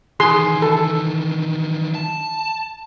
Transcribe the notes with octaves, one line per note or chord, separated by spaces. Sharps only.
D#3 E3 G#4 C6
A4
A5